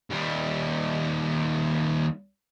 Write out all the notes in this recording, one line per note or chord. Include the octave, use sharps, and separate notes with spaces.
D#2 G3